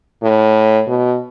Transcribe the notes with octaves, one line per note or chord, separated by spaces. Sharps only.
A2
B2